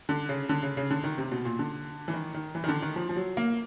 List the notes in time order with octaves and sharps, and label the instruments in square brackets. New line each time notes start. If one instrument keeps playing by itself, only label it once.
[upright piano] D3
C#3
D3
C#3
C#3
D3
D#3
C3
B2
A#2
D3
E3
D#3
D#3
E3
D#3
D3
D#3
F3
F3
F#3
A#3